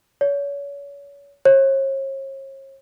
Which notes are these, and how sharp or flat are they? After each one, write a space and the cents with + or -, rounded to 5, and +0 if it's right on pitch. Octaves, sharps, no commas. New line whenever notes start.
C#5 +35
C#5 -40